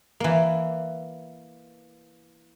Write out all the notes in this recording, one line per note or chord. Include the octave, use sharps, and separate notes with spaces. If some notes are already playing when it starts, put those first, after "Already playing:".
E3 A#3